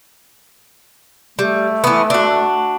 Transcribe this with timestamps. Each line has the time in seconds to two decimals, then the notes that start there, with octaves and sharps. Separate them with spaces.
1.39 G3 A3
1.84 E3 B3
2.10 D4 F#4